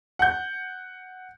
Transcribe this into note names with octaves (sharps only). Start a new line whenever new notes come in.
F#5 G6